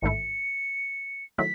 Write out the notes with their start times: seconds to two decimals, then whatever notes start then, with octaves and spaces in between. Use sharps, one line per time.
0.02 A1 G#2 D#3 A3 E4 C#7
1.38 D#3 F#3 A3 E4 B6